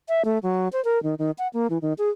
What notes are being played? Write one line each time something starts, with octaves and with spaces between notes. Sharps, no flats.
E5
A3
F#3
C5
A#4
D#3
D#3
F#5
A#3
E3
D#3
G#4